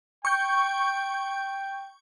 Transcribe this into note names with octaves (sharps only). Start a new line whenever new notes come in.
G5 C#6 G6